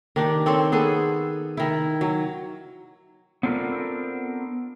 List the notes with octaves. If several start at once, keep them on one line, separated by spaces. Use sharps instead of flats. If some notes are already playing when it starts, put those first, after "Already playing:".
D#3 D4 G4
C4 A4 C5 C#5
B3 G#4 A4
D#3 E4
F#3
B3 C4 D4 F4 A4 A#4